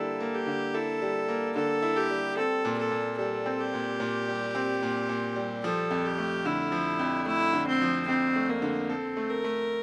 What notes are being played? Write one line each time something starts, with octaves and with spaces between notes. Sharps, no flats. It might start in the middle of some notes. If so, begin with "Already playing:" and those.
Already playing: D3 G3 A#3 E4 A4
A#3
G4
D3
E4 A4
G3
A#3
D3 A4
E4
G4
G3
C4 A4
A#2
A4
A#2
G3 A4
C4
G4
A#2
A#2
G3
C4
A#2
A#2
G3
F3 A4
F2
G4
A3
D3 E4
F3
F2
A3 E4
D3
C4
F3
F2 C4
A3
A#3
D3
C4 A4
A3
A#4
A3